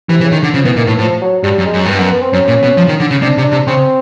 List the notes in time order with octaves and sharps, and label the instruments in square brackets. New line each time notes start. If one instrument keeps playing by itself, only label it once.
[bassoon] C3 [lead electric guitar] E3
[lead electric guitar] E3
[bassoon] C#3
[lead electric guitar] D#3
D3
[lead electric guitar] C#3 [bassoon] F3
[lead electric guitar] B2 [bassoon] E3
[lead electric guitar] A#2 [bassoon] D#3
[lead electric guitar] A2 [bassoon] E3
[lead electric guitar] A2 [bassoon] F3
[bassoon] F#3
[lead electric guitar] G2 [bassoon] G3
[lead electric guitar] F#2
[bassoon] G#3
[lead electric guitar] F#2
[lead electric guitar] G2 [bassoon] B3
[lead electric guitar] F#2 [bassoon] B3
[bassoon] B3
C4
[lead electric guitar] F#2 [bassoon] C#4
[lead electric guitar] A#2
B2
F3
D#3
D3
C#3
[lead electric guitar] C3 [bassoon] D4
[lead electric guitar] C3
[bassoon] D4
[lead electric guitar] C3
[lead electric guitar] C#3 [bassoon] C4